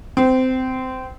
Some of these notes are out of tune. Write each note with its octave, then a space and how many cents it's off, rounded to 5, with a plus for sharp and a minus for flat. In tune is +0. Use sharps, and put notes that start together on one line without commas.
C4 -20